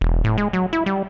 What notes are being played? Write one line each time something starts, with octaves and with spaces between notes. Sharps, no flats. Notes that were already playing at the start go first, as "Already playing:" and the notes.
E1
A2
G#3
F#3
E4
G3